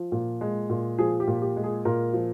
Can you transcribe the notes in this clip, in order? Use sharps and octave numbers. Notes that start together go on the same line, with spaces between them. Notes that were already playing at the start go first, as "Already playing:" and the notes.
Already playing: F3
A#2
G#3
A#2
F3 G#4
G4
A#2
G4
G#3
G#4
A#2 A#4
F3